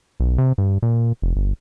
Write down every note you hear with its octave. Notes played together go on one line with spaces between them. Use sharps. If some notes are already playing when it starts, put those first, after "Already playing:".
B1
C3
G2
A#2
F1
G1